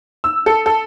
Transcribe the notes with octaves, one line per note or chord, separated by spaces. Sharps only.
E6
A4
A4